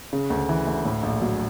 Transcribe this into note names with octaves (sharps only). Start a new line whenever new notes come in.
C#3
D2
E3
D2
A2
A#1
F#3